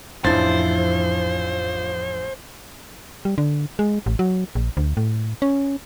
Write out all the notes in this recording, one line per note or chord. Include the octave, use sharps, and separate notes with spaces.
A1 F2 E3 F3 D4 E4 C5 A6
G3
D3
G#3
A1
F#3
A#1
D2
A2
C#4